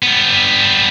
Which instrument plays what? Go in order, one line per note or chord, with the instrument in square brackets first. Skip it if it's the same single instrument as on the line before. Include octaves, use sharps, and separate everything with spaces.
[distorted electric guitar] G3 B3